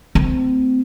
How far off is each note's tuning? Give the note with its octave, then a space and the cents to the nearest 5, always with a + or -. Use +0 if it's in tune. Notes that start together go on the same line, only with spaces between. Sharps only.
A3 +0 C4 -30